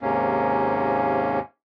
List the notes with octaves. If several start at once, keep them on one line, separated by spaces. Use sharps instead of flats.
D#2 G#2 C3 A#3 C#4